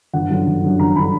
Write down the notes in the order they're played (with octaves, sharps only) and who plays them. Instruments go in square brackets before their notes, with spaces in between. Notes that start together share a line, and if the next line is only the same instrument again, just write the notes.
[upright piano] G1 F#5
F#2 D3
G1
F#2 D3
G1 A#5
D3 B5